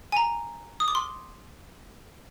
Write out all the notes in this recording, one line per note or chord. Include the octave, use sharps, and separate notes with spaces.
G#5
A#5
D#6
D6
C6